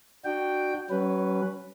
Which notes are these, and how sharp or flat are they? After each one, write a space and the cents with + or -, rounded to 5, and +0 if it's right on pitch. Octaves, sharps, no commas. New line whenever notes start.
D4 +25 F#4 +0 G5 +0
F#3 +35 C#4 +0 B4 +0